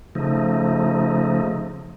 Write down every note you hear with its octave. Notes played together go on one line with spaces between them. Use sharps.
C#3 F3 A3 D#4